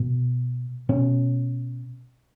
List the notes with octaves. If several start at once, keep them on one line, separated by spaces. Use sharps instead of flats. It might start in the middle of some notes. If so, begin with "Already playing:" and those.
Already playing: B2
B2 C#4